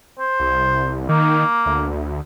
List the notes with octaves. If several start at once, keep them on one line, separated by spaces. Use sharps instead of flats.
C5
C2
D#3 A#3
D2